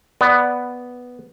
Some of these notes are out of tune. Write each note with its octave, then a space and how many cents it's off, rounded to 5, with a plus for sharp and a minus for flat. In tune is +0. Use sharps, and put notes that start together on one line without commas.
B3 +0 D5 +0